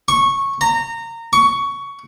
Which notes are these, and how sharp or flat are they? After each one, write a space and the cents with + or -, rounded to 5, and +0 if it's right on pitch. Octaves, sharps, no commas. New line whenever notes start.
C#6 -10
A#5 -20
C#6 +15